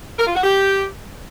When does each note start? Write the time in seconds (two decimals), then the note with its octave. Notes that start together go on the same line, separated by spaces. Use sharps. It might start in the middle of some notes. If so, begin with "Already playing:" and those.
0.18 A#4
0.27 F4
0.35 F#4
0.44 G4